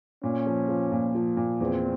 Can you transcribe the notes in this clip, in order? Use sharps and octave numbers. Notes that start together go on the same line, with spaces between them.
A#2 C#4
F3
F3
A#2
F3
A#2
E2 C4